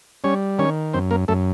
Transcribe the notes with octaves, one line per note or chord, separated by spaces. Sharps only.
G3 C#4 C#5
D#3 C#4 C#5
F#2 C4 C5
A#3 A#4
F#2 A3 A4